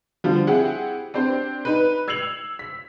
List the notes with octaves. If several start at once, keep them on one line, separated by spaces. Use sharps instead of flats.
D3 F3 G3
C4 E4 G4 G#4 F#5
C4 D4 G4 C5
D#4 B4
E6 G#6 C7 C#7 F7 F#7
B6